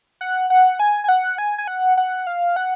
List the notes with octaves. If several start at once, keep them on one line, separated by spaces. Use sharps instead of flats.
F#5
F#5
G#5
G#5
F#5
G#5
G#5
F#5
F#5
F5
F#5